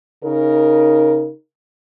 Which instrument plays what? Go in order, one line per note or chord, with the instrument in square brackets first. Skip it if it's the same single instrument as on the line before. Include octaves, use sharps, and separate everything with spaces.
[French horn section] C#3 D#4 A#4